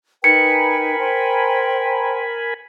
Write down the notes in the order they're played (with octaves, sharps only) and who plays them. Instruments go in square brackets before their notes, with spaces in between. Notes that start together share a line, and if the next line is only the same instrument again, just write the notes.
[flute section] D#4 B4 G5 [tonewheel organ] A#4 G#5 B5 [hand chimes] C#7
[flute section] C5 G5 C6